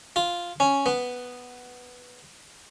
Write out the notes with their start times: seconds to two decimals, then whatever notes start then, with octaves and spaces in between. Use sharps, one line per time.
0.16 F4
0.60 C#4
0.86 B3